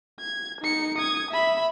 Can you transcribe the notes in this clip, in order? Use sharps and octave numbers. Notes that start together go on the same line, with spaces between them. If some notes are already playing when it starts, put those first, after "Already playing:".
G#6
D#4 C#7
D#6 G#6
E5 B5